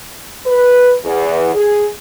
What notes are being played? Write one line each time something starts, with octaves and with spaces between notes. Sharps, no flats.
B4
E2
G#4